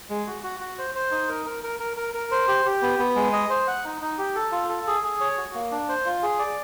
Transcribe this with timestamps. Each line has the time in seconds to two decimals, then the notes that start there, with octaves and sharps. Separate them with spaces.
0.10 G#3
0.27 F#4
0.44 F#4
0.60 F#4
0.78 C5
0.95 C5
1.11 D#4
1.29 A#4
1.46 A#4
1.63 A#4
1.80 A#4
1.97 A#4
2.14 A#4
2.31 C5
2.48 G4
2.66 G4
2.82 B3
2.99 B3
3.16 G#3
3.33 D#5
3.50 C5
3.68 F#5
3.85 D#4
4.01 D#4
4.18 G4
4.36 A4
4.52 F4
4.69 A4
4.87 G#4
5.04 G#4
5.20 C#5
5.38 F#4
5.54 A#3
5.72 D4
5.89 C5
6.06 F4
6.23 G#4
6.39 D5